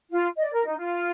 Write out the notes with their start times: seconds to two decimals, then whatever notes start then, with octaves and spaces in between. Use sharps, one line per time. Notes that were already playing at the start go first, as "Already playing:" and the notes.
0.11 F4
0.36 D#5
0.39 D5
0.53 A#4
0.66 D#4
0.77 F4